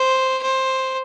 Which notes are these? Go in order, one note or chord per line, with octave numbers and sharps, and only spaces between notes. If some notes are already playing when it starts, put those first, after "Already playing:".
Already playing: C5
C5